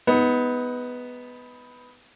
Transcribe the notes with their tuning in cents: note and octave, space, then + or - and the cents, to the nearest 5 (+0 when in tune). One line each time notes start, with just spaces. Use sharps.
G#3 +0 B3 +5 D#4 +25